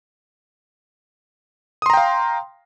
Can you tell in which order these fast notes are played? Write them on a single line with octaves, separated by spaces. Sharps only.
D#6 C6 A#5 G5 F5